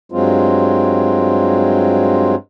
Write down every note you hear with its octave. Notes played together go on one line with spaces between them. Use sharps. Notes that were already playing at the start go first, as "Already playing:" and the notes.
G2 F#3 G#3 C4 F4